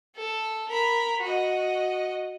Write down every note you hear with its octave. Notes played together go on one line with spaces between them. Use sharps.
A4
A#4 B5
F#4 D#5